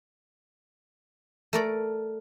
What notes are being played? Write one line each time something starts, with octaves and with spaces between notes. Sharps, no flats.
A3 A#4 D5